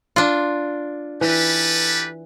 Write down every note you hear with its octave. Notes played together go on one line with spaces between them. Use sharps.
D4 F4
E3 G4 A4 B4